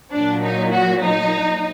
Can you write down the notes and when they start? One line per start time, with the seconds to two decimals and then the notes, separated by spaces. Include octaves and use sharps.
0.11 A#2 F#3 D4
0.41 D#4
0.71 F#4
1.02 D#4